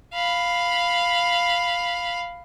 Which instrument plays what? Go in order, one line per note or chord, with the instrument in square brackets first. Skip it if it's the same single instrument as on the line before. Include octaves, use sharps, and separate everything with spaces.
[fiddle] F5 B5